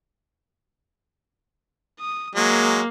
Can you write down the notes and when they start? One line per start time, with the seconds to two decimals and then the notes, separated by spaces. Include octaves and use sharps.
2.00 D#6
2.35 F#3 G#3 A#3